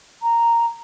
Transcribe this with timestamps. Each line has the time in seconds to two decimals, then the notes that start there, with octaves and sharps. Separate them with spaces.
0.22 A#5